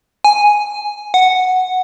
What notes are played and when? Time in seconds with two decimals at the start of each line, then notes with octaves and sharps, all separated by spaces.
0.24 G#5
1.14 F#5